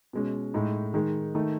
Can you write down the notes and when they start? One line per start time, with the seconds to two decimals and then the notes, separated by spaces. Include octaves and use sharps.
0.13 B2 G#3 C#4
0.54 A2 G#3 D#4
0.94 D#3 G#3 D#4
1.35 D#3 A3 D#4